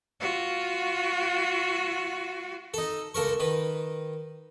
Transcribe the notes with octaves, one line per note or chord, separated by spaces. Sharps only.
F4 F#4
D#4 A4
C#2 A4 A#4 C#6
D#3 B4